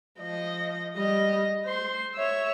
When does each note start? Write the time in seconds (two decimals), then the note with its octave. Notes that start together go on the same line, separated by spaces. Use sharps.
0.19 F3 D#5
0.96 G3 D#5
1.65 C5 C6
2.15 C#5 E5